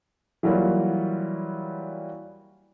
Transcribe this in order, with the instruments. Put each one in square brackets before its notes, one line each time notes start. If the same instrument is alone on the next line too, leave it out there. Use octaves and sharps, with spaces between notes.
[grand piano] E3 F#3 G3 A#3 F4 C#5